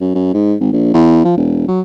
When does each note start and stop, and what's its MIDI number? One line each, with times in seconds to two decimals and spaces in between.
0.01 0.10 42
0.15 0.31 42
0.34 0.55 44
0.60 0.68 32
0.73 0.89 34
0.94 1.23 40
1.25 1.34 53
1.37 1.64 28
1.68 1.81 54